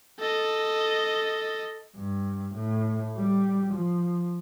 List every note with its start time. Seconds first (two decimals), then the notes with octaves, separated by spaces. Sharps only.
0.19 A4 D#5
1.96 G2
2.55 A2
3.17 G3
3.73 F3